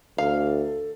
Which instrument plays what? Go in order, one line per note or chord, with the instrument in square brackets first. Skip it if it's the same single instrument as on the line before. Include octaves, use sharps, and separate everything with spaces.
[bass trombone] D2 [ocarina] A4 [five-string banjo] F5